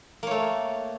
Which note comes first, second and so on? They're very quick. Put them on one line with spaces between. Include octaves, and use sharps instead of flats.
A#3 C#5 A3